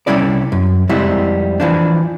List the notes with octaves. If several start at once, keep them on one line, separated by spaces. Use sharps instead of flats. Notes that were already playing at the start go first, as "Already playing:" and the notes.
C2 A2 G3 C#4 E4 D5
F#2
F2 G3 G#3 C4 E4 F#5
E3 F3 D4